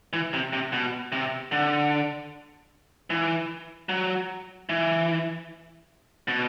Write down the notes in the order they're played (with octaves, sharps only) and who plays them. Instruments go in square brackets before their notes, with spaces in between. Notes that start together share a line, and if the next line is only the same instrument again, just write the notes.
[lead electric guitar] E3
C3
C3
B2
C3
D3
E3
F#3
E3
B2